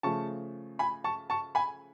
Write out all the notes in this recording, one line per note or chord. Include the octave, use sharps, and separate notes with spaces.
C#3 F3 A3 A5 C#6
G#5 B5
A5 C#6
A5 C#6
G#5 B5